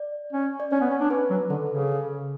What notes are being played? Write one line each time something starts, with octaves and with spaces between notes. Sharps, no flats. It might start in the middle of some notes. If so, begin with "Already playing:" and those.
Already playing: D5
C#4
D5
C#4 C#5
B3
C#4
D4
C#4 B4
F#3
D3 A4
C#3